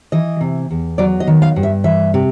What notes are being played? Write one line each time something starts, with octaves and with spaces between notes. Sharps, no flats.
E3 D#5
C3
E2
F#3 D5
D#5
D#3
F5
G2
E5
E3 E5
C3